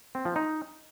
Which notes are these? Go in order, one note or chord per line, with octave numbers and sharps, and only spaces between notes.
C4
F3
D#4